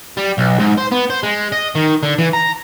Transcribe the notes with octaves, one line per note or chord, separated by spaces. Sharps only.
G3
B1
G#2
C5
B3
C5
G#3
D#5
D#3
D3
E3
A#5